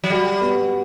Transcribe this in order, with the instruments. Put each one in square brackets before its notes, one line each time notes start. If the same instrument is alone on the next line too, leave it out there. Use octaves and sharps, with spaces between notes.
[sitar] F#3
[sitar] G3 [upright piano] F#4
[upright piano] B3